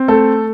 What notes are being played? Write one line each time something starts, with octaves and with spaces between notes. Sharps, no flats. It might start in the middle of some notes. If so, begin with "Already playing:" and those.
Already playing: C4
A3 A4